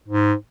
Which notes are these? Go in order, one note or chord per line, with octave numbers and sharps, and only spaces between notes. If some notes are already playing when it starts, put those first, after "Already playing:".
G#2